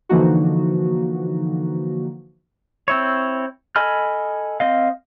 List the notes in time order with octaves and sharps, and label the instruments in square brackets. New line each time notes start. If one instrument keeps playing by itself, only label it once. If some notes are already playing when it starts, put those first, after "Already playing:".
[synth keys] D3 E3 F3 A#3 D#4 F#4
[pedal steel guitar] C4 E4 C#5
A4 D#5 G#5 B5 F6
C4 D#5 F5